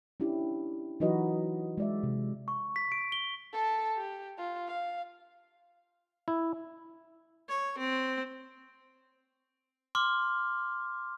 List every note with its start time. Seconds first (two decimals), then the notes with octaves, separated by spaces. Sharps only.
0.20 C#4 D4 E4 G4
1.00 E3 F#3 D#4 F#4 B4 D#5
1.78 G#3 D5 E5
2.03 C3
2.48 C#6
2.76 B6
2.92 D7
3.12 G7
3.53 A4 A5
3.97 G4
4.38 F4
4.67 F5
6.28 E4
7.49 C#5
7.78 C4
9.95 C6 D6 F6